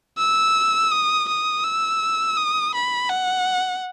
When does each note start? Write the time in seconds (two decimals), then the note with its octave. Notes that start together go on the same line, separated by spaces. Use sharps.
0.18 E6
0.91 D#6
1.28 D#6
1.64 E6
2.37 D#6
2.74 B5
3.10 F#5